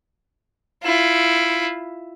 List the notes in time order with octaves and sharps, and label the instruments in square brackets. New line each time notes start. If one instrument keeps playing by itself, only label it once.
[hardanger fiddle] E4 F4